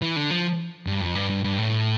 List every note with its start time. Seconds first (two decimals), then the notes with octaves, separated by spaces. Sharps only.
0.02 E3
0.16 D3
0.31 F3
0.87 G2
1.01 F2
1.15 G2
1.30 G2
1.44 G2
1.58 A2